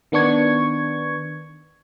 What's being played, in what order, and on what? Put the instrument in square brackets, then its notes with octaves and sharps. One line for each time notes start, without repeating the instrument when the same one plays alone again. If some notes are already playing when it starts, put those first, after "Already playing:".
[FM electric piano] D#3 B3 D4 C#6 G#6